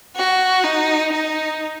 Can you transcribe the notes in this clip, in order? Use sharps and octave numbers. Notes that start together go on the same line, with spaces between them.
F#4
D#4
D#4